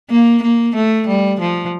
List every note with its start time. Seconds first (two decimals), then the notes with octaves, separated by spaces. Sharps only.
0.10 A#3
0.43 A#3
0.75 A3
1.08 G3
1.40 F3